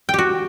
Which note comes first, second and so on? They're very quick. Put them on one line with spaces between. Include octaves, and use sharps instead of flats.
G5 G4 F#4